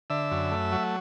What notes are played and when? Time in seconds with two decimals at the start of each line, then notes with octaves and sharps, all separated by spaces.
0.10 D3 E5
0.31 F#2
0.51 A3
0.72 F#3